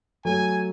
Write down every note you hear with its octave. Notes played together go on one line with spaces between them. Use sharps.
F#3 A3 G#5